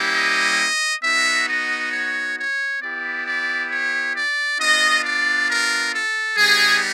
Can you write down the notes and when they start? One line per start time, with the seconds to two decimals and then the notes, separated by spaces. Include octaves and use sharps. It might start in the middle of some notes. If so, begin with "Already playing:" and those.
Already playing: G3 A#3 C#4 E4 G4
0.14 D#5
1.03 B3 D#4 F#4 E5
1.48 D#5
1.92 C#5
2.37 C#5
2.81 B3 E4 G4 D5
3.25 D5
3.71 C#5
4.15 D5
4.59 B3 D4 F4 D#5
5.04 D5
5.48 A#4
5.93 A4
6.38 G3 B3 D#4 G4 G#4